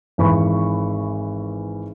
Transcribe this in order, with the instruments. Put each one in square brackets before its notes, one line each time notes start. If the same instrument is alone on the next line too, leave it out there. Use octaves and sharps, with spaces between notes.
[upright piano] G#1 E3 B5 C#6